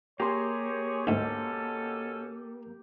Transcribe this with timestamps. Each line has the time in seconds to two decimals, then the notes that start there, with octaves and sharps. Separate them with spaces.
0.20 A#3 G4 G#4 C#5 C6
1.07 D2 G#2 B2 C#4 A4